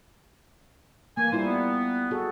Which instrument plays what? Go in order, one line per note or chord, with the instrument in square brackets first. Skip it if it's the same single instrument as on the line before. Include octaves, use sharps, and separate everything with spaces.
[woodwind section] E3 G#5 [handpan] A#3
[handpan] G3 E4 F4 [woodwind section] C5
[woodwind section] B3
[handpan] F#4 G#4 A4